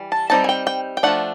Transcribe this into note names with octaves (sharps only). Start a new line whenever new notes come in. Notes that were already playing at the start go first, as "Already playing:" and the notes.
Already playing: E3 G3
A5
G3 C4 D#4 A5
G#5
G5
G5
G5
F3 A3 D4 F#5